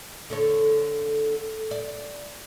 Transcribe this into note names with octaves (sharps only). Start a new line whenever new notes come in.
D3 A4 C#5
D5